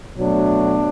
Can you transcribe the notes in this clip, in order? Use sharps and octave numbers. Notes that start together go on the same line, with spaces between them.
B2 F#3 A3 D4